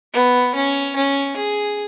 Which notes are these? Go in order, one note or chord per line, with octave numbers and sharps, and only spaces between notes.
B3
C#4
C#4
G#4